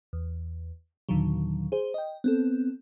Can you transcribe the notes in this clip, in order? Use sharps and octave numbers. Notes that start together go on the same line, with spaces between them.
E2
D#2 A#2 D3 D#3 F#3
G#4 C5
D#5 G5
B3 C4 A4